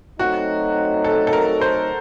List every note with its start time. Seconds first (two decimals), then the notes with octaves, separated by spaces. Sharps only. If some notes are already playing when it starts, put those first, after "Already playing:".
0.19 F#3 A3 C4 D#4 F#4
1.04 A4
1.27 A4
1.33 A#4
1.61 C5